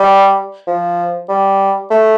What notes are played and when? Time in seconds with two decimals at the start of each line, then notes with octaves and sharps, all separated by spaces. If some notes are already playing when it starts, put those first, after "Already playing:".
Already playing: G3
0.67 F3
1.29 G3
1.91 A3